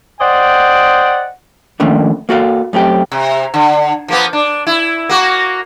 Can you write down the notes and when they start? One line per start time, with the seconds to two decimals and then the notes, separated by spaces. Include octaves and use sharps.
0.20 C5 D5 D#5 F#5 G5
1.80 D#3 F3 A3 A#3 C#4 D4
2.29 A#3 F#4 A4 F5
2.73 F#2 A3 C4 G4
3.12 C3
3.54 D3
4.08 F3 A#3 B3
4.33 D4
4.67 E4
5.09 A#3 F#4